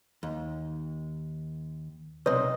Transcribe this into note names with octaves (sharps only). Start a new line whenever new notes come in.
D#2
B1 C3 B4 C#5 D#5